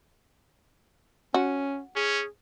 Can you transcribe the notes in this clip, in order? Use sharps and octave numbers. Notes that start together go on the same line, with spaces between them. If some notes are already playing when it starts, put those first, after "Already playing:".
C#4 F#4
C#4 G#4